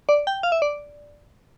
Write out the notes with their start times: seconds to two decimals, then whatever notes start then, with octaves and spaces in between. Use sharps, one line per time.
0.09 D5
0.27 G5
0.43 F5
0.52 E5
0.62 D5